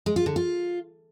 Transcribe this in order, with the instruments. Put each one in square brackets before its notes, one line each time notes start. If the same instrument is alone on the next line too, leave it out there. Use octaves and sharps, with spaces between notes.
[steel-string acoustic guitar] G#3
F4
D3
F4